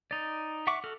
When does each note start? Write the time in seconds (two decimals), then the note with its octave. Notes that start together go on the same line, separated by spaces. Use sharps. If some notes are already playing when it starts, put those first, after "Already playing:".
0.11 D#4 D5
0.67 E5 F#5 C#6 D6
0.84 F#4 A4 F6